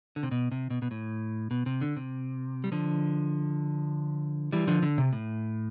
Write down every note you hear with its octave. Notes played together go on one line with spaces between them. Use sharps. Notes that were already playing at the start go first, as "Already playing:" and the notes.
D3
C3
B2
C3
B2
B2
A2
B2
C3
D3
C3
G3
D3 F3
E3 G3
D3 F3
D3
C3
A2